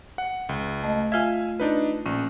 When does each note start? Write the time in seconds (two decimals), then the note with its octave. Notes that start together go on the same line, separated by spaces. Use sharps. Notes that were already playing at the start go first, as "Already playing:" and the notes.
0.18 F#5
0.49 C#2
0.83 A3 D#5
1.12 F4 E5 F5 G#5 G#6
1.60 D4 D#4 B4
2.06 A#1 C#4